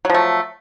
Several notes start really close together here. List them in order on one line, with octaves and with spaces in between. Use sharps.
F#3 F3 A3